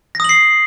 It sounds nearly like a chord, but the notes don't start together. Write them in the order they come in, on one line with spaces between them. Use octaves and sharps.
A#6 D#6 F#7 C7